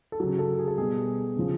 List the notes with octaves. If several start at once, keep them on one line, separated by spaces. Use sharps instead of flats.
A4
C#3 F#3 G#4
A4
G#4
A4
B2 G3 G#4
C#3 F3